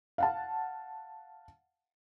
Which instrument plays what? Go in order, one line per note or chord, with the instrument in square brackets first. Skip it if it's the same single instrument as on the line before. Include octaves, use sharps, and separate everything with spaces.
[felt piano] F5 F#5 A5